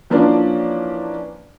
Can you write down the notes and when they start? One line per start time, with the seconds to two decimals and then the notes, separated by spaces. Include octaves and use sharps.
0.10 E3 F3 A#3 C#4 D4 D5